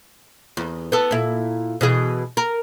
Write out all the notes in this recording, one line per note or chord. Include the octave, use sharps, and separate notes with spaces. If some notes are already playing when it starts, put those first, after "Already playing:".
E2
B3 A4
A#2 E4
B2 E3 G#4
A#4